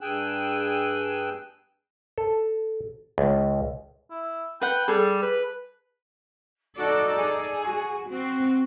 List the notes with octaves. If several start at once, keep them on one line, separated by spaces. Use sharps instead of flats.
G2 G#4 G5 G#5 E6 F#6
A4
C#2
E4
B4 F#5 G5
G3 G#4 A4
B4
D#4 F#4 A4 D5
G#4
F#4
C4 F#4